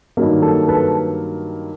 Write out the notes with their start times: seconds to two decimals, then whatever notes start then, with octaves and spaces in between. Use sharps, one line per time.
0.17 G2 D#3 F#3 A#3
0.42 A4
0.68 A4 B4